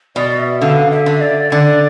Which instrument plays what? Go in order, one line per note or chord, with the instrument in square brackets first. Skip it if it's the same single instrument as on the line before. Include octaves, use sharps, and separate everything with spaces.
[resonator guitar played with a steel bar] B2 [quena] D5
[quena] E5
[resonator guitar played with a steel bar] D3 [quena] F5
[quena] E5
[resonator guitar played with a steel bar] D3
[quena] D5
[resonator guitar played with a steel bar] D3 [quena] D5